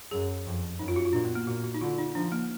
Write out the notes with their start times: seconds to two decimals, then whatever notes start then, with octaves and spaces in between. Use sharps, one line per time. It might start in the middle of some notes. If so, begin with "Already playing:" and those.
0.11 F#2 G#4
0.45 F2
0.79 F#2 D#4
0.88 F4
0.96 F#4
1.05 F4
1.13 A#2 D4
1.25 B3
1.35 A#3
1.47 A#2 F#4
1.64 F#4
1.74 D#4
1.81 D3 F4
1.99 D#4
2.15 F3 D4
2.32 A#3